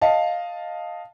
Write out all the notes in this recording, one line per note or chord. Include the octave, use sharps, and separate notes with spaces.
D#5 F5 A5